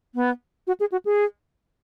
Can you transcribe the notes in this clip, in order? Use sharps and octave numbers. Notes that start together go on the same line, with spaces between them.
B3
F#4
G#4
F#4
G#4